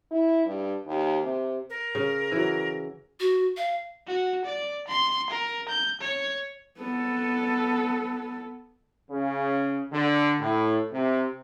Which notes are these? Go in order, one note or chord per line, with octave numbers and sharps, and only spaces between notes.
E4
G2
D#2
C3
A#4
C#3
E3 F#3
F#4
F5
F#4
D5
C6
A#4
G6
C#5
B3 A4
C#3
D3
A2
C3